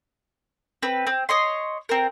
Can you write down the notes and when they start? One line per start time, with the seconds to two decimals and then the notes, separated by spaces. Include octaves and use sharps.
0.83 C4 B4
1.07 C4
1.29 C#5 D#5 C6
1.89 C4 A#4